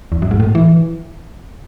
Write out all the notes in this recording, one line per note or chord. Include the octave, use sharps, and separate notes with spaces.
E2
F#2
G#2
A2
E3